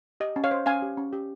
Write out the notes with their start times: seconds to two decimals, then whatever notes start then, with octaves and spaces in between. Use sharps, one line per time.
0.20 G4 D#5
0.36 C#4
0.44 C#5 F5
0.51 C5
0.66 C#4 F5 G#5
0.82 G4
0.97 C#4
1.13 G4